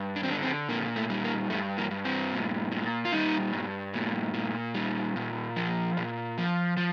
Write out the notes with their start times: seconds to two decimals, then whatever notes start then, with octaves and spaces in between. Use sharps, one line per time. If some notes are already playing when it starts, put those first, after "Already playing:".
Already playing: G2
0.16 D4
0.23 C4
0.28 D3 D4
0.42 C4
0.69 A#2 A#3
0.96 A3
1.10 G3
1.24 A#3
1.50 G2 A3
1.78 A#3
1.91 G2
2.05 C4
2.32 A#2
2.72 A#2
3.05 F4
3.12 G3 D#4
3.53 G2
3.94 A#2
4.34 A#2
4.74 G3
5.16 A#2
5.56 F3
5.97 A#2
6.38 F3
6.77 F3